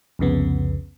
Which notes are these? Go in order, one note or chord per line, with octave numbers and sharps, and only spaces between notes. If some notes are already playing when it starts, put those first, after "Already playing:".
C2 F2 C#3 B3